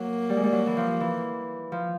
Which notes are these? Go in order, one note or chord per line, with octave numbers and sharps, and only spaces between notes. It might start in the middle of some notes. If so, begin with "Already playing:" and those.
Already playing: F#3 A#3
G3
G#3
G3
F#3
E3
F3
E3
F3